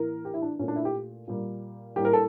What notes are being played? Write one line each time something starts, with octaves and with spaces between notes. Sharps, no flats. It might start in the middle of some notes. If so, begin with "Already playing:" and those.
Already playing: A2 E3 A#3 A#4
G4
E4
D4
A#2 A3 C#4 D4
E4
G4
A#2 G3 A#3
A2 G3 A#3 G4
A#4
A4